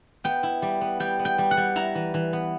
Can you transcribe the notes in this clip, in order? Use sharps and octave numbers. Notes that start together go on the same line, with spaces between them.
B3 G5
E4
G3
B3
G3 G5
B3
G5
G3
F#5
G3
E4 A#5
E3
E3
B3